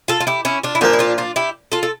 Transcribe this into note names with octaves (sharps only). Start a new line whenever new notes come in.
F4 A4
F4
E4 G4
C#4 E4
D4 F4
E4
A#2 F3 A#3 D4 F4
E4
D4 F4
D4 F4
E4 G4
F4 A4
A4